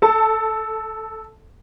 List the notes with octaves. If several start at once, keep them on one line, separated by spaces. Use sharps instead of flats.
A4 A5